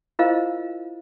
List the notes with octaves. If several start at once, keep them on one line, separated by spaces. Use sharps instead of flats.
E4 F4 A#4 C5 D#5 F5